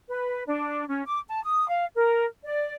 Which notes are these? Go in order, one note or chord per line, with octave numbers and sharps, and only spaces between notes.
B4
D4
C#4
D6
A5
D#6
F5
A#4
D5